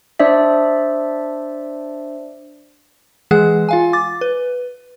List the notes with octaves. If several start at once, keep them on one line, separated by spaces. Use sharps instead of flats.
D4 C5 D5 E5
E3 G#3 G#4 F#5 F#6
F4 F5 G#5
D6 A6
B4